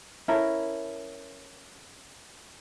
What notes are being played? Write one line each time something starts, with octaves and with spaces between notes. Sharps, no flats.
C#4 E4 A4 A#4